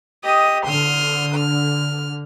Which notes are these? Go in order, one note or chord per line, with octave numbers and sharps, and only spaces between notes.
G4 D#5 D#6
D3 C6 D#6 F6
F6